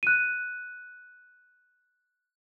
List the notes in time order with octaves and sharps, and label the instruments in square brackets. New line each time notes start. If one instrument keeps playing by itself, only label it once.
[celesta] F#6 D#7